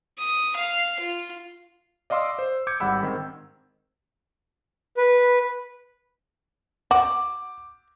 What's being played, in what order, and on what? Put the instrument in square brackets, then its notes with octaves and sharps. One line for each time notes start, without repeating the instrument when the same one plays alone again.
[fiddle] D#6
F5
F4
[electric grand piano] D5 D#5 F5 C6 D6 E6
C5
D6 G6 G#6 C#7
G#1 G3 F#5 B5 E6
G#2 D#3 C4
[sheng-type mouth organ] B4
[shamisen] F#4 [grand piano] D6